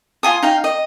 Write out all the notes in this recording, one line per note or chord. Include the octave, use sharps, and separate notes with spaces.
F4 G#5 D#6
D#4 F5 G5
D#5